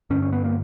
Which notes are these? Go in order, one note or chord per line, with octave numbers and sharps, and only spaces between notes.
G2 D3 C#4
C#4
B3
A#3